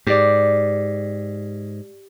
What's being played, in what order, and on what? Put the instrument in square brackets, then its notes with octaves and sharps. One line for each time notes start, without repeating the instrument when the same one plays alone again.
[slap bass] G#2 [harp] G4 D5